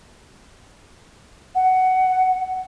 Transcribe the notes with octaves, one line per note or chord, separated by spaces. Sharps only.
F#5